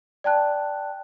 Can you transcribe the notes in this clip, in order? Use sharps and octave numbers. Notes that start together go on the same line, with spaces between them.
D5 G5 A5 F#6